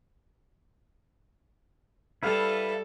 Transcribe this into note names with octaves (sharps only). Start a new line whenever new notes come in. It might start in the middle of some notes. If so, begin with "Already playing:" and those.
G3 E4 A4 B4 F5